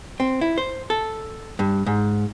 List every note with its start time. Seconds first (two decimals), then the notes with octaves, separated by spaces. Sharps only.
0.20 C4
0.41 E4
0.58 C5
0.90 A4
1.59 G2
1.86 G#2